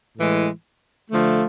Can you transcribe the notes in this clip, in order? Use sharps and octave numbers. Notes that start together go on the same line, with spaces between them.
A2 E3 G#3
D3 F3 A3